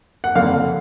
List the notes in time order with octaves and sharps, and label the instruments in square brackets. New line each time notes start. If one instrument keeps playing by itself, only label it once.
[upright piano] F#5
F#1 F2 D3 F5